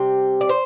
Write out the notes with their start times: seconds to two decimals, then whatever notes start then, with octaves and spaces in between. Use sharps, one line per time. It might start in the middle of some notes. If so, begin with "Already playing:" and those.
Already playing: C3 G3 C4
0.41 D5
0.49 C5